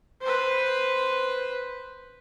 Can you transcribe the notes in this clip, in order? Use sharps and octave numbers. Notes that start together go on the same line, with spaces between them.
B4 C5